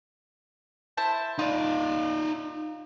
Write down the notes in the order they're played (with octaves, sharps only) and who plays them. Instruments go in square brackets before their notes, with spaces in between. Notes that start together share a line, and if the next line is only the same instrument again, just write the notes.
[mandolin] E4 C5 A5
[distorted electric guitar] D#4 D5 [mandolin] F4